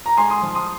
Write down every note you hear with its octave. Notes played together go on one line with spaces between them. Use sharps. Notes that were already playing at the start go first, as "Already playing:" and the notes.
A#5
G#2 G#5 C6
C6 D#6
F3
C6 D#6